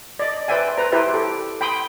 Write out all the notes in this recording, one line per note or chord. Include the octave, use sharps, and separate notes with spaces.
D5 D#5
B4 C5 D5 E5 G5 G#5
B4 C5 A#5
E4 G4 B4 C5 E5
G4 A4
G5 B5 C6 D#6